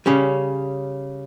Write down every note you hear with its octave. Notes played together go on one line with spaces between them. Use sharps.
C#3 G3 C#4